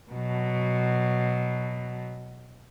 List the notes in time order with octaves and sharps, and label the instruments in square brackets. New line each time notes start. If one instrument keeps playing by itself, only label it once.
[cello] B2 F#3